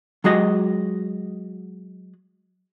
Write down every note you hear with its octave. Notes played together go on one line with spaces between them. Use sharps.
F#3 G#3 F#4 D#5